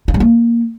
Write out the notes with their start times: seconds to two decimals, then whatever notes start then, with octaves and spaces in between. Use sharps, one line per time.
0.08 F4
0.14 G3
0.20 A#3